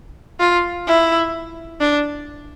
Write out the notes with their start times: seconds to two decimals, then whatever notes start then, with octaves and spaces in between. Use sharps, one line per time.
0.40 F4
0.88 E4
1.81 D4